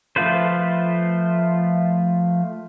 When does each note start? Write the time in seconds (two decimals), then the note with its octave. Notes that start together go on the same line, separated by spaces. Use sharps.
0.16 F3 A3 F4 B4 C5